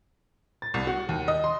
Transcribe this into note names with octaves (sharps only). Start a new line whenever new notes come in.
A6
C2
F#4
D#2
D#5
C6